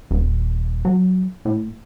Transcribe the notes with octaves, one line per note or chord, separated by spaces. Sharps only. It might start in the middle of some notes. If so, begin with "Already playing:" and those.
D#1
F#3
A2